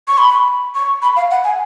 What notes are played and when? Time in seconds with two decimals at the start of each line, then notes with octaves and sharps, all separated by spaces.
0.08 C#6
0.18 B5
0.75 C#6
1.02 B5
1.16 F5
1.31 F#5
1.44 G#5